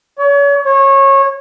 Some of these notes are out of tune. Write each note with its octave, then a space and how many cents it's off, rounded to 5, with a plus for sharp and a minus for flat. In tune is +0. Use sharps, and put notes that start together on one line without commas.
C#5 +35
C#5 -25